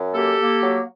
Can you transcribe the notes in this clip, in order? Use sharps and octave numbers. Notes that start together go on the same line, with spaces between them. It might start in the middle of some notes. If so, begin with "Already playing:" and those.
Already playing: F#2
A#3 G4 A4
A#3
F#3